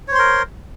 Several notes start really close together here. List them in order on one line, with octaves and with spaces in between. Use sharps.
C#5 C5 C6 A#4